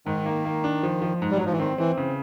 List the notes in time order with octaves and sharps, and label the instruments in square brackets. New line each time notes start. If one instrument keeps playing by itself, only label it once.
[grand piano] G#2 [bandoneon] D#3
[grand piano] A#3
A#3
D4
F3
F3
G#2
[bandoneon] G3
F#3
[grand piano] G#2 [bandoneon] F3
[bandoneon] E3
[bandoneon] D#3 [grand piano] C4
[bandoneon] E3 [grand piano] C4
[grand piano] C#3